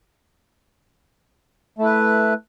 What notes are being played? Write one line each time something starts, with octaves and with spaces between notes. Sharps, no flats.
A3 E4 B4